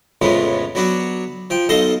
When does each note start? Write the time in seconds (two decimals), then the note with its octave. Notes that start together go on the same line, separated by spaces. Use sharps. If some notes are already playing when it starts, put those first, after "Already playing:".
0.22 F2 A2 C#3 F3 G#3 B3
0.75 F#3 B3 D4 F#4
1.50 F3 G5
1.69 B1 A4 D#5 F5 C6